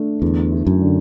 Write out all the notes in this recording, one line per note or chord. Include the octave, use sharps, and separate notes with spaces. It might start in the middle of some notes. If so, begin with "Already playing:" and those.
Already playing: A3 D4
E2 D3
E4
F#2
D3